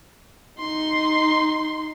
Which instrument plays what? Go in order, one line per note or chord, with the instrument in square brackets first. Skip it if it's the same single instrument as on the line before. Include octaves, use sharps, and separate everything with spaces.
[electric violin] D#4 C6